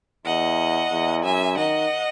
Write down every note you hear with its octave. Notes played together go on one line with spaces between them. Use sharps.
E2 D#5 F#5
E2
F#2 E5 G#5
D#3 D#5 F#5